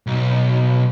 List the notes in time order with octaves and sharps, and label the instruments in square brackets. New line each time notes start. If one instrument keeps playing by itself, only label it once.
[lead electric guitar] B1